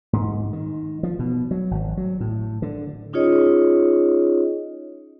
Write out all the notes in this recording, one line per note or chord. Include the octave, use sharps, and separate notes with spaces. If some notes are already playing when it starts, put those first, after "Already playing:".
G#2
D#3
F3
B2
F#3
G#1
F#3
A2
D3
C#4 D#4 F4 G#4 C#5 D#5